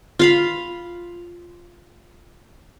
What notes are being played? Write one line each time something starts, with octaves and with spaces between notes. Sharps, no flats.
F4 F5 B5